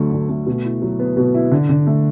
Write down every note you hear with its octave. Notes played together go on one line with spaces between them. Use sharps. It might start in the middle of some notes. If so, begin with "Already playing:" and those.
Already playing: D2 D3 F#3 A3
D2
A3
B2
E4
F#3
B3
B2
E4
D3
D3
A3